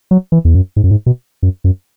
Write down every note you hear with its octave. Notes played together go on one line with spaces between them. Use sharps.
F#3
E3
E2
F#2
G#2
F#2
G#2
B2
F#2
F#2